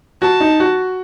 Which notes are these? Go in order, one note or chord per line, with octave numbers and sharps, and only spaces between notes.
F#4 A5
D#4
F#4